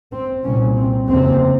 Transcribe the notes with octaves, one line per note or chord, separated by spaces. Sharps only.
C4
C2 A#2 C#4
C4
F1 D#2 C#3 C4